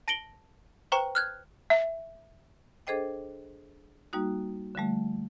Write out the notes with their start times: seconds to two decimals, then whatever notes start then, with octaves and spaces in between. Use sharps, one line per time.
0.08 A5 A#6 C#7 D7 F#7 G7
0.92 B4 C5 G5 A#5 C#6
1.15 F6 F#6 G#6
1.70 E5
2.87 D4 G#4 A4 C5 D#5 G5
4.13 G3 A#3 D#4 F#4
4.75 D3 F3 G3 A3